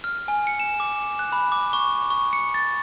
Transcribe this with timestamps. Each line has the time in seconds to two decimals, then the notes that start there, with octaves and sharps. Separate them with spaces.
0.04 F6
0.28 G#5
0.47 C#7
0.60 E7
0.80 D6
1.19 F#6
1.32 B5
1.52 D6
1.73 C#6
2.10 C#6
2.33 C#7
2.54 A6